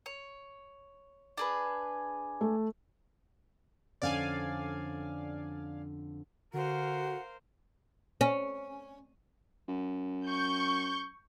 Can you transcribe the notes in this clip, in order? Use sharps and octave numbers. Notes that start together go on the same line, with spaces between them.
C#5
D4 G#4 B4
A3
F2 D3 C#4 D5 F5 G#5
D3 F#4 A#4 C5 F5 F#5
C#4
F#2
C#6 G6